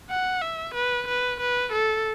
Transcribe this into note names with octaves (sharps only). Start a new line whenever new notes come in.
F#5
E5
B4
B4
B4
A4